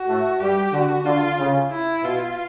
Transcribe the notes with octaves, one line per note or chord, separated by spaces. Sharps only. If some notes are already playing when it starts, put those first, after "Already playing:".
Already playing: F#4
A2 A3
G2 G3 G4
D3 F#4
D3 F4
C#3
E4
B2 F4